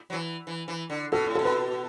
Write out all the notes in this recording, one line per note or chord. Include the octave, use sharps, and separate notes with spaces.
F#3
E3
E3
E3
D3
B2 A4
A2
B2 A4
B4